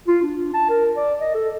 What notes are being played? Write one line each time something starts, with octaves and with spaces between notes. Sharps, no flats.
F4
D4
A5
A#4
D5
D#5
A4